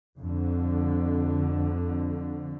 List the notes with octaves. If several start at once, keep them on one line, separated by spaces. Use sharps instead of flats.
F2 D3